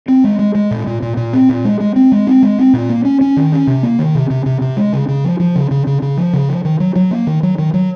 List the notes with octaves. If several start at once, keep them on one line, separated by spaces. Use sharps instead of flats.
C4
G#3
G#3
G#3
A#2
A#2
A#2
A#2
C4
A#2
G#3
G#3
C4
G#3
C4
G#3
C4
A#2
A#3
C#4
C#4
D#3
C#4
C3
A#3
D#3
C3
C3
C3
C3
G#3
C#3
C#3
F3
F3
C#3
C#3
C#3
C#3
F3
C#3
F3
D#3
F#3
F#3
A#3
D#3
F#3
D#3
F#3